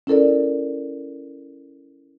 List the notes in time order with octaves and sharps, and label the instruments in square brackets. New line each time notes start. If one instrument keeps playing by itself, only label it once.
[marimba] C#4 E4 A4 A#4 D5